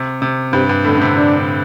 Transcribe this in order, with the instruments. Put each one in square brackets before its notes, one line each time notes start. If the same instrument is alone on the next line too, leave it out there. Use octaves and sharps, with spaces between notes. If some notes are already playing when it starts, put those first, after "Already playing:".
Already playing: [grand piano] C3
C3
[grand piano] G2 [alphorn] C3
[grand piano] G2
[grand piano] A2 [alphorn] D3
[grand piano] D3
C3
[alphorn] D4